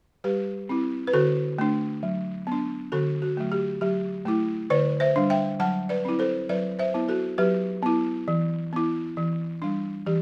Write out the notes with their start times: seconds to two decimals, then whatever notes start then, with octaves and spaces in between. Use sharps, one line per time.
0.24 G3 G4 B4
0.69 C4 E4
1.07 B4
1.13 D3 F#4 A4
1.58 A3 D4
2.03 F#3
2.47 B3 D4
2.92 D3 F#4 A4
3.22 F#4
3.37 F#3 A3
3.52 G4
3.81 F#3 G4
4.26 A3 E4
4.70 D3 B4 D5
5.00 C5 E5
5.16 G3 D4
5.30 E5 G5
5.60 F#3 F#5 A5
5.89 B4 D5
6.05 C4 E4
6.19 A4 C5
6.49 F#3 B4 D5
6.79 C5 E5
6.94 B3 E4
7.08 F#4 A4
7.38 F#3 G4 B4
7.83 B3 E4
8.28 E3
8.73 B3 E4
9.17 E3
9.62 G3 D4
10.06 E3 G4